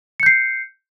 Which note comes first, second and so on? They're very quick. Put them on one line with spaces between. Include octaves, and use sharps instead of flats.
C#7 G6 C7